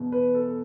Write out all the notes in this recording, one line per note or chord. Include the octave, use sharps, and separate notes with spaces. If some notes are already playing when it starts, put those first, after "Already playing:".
Already playing: E2 B2
B4
A4